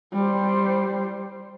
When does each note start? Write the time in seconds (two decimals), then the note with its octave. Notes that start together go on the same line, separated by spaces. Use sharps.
0.14 G3 C5